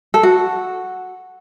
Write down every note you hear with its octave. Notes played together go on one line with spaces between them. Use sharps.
A4
F#4